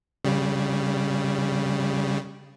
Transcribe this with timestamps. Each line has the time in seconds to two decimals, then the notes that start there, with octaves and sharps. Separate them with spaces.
0.25 C#3 G3